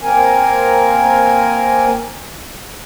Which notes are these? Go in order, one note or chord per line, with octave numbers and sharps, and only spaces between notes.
A#3 C4 A#4 G#5